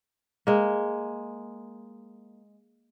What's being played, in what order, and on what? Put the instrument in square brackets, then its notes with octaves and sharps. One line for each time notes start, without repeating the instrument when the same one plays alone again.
[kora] G#3 A#3